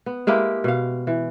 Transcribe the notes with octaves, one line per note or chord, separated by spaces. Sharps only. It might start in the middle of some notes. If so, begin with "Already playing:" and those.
B3
G#3 A#3 E4 G4
B2 F5
E3